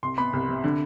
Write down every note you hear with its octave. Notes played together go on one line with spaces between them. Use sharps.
C2 C6
B3 B5
C2
C3
D3